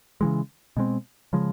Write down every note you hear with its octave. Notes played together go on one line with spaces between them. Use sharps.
C#3 E3 G#3
B2 G#3 C4
C#3 F3 G#3